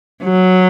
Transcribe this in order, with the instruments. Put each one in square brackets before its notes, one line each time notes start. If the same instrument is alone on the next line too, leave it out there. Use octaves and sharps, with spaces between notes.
[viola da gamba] F#3